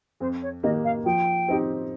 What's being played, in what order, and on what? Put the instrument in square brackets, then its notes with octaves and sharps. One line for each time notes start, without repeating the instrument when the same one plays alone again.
[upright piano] F2 [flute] C5
[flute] C#5
[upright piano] D#3 A#3 D#4 G4 [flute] D#5
[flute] F5
[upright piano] F3 [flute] G5
[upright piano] C4 D#4 G4